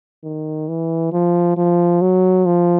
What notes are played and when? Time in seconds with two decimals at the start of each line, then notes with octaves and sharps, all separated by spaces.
0.24 D#3
0.68 E3
1.12 F3
1.57 F3
2.01 F#3
2.46 F3